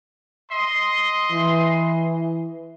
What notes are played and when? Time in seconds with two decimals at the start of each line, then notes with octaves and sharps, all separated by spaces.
0.51 D#5 C6
1.31 E3